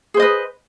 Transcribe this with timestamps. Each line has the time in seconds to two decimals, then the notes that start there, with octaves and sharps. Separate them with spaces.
0.14 G#4
0.17 C5
0.20 D#5
0.22 B4